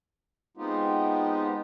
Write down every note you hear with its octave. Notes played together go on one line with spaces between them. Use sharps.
G#3 B3 C4 D#4 F4 G4